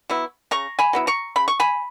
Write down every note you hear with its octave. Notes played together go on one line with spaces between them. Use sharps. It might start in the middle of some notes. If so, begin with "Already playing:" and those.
F#3 B3 E4
C#3 A#5 C#6
G#5 B5
F#3 B3 E4
A#5 C#6
C#3 B5
C#6
G#5 B5